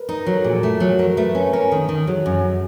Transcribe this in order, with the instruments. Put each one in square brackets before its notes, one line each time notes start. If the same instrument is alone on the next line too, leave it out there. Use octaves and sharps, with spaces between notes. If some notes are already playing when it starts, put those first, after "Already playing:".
Already playing: [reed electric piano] A#4 B4
[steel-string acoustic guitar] D#4
[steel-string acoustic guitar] F#3 [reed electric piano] A#4
[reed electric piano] A4
[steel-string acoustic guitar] A#2 [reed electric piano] G#4
[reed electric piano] A4
[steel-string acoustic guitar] A3
F#3
[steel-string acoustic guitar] A3 [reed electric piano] A#4
[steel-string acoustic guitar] A3 [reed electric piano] B4
[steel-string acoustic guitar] C#4 [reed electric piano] B4
[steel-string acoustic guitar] C#4 [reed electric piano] A#4
[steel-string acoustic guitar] D#3 [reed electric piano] A4
[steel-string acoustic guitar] D#3
[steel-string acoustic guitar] F#3 [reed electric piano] G#4
[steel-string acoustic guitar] F#2